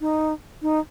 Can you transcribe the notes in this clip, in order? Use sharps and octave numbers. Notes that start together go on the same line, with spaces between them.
D#4
D#4